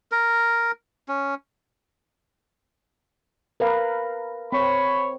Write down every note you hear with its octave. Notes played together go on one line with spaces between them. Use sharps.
A#4
C#4
A#4 B4 F5
C4 C#5 B5